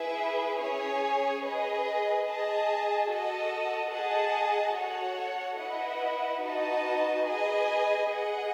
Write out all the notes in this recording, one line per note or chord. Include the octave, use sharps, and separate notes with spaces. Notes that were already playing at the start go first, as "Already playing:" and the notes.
Already playing: E4 G#4 B4 E5
C#4 G#4 C#5 G#5
G#4 B4 D#5
G#4 D#5 A5
F#4 A4 D#5
G#4 D#5 F#5 A5
F#4 A4 C#5 F#5
E4 B4 D#5 F#5
D#4 F#4 B4 D#5 A5
G#4 B4 D#5 G#5
G#4 D#5 F#5